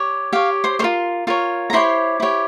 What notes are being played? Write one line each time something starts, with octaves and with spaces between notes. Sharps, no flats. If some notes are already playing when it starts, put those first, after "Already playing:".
Already playing: G4 C#5
G4 C#5 F5
C5 C6
F4 A#4 C5 C#5 C6
F4 A#4 C#5
A#5
E4 G4 C5 C#5 C6
E4 G4 C#5